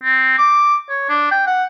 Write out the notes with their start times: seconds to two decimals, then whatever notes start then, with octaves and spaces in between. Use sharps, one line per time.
0.03 C4
0.38 D6
0.89 C#5
1.09 D4
1.31 G5
1.47 F#5